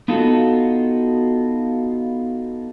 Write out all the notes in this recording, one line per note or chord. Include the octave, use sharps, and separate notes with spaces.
B3 D#4 F4 F#4 A4